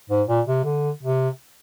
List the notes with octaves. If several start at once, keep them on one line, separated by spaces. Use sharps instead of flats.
G#2
A#2
C3
D3
C3